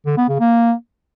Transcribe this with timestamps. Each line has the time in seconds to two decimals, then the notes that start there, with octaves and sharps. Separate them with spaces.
0.06 D3
0.17 B3
0.29 C#3
0.40 A#3